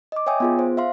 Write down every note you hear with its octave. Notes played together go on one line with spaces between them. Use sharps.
D#5 D6
C#5 E5 G5 G#5 D#6
B3 F4 G#4
C5
E5 F5 C6